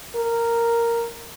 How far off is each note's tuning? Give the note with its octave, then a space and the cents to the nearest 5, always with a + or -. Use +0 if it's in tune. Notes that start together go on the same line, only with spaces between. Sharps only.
A#4 -5